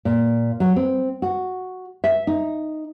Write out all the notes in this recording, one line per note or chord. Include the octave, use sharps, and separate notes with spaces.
A#2
F#3
C4
F#4
E5
D#4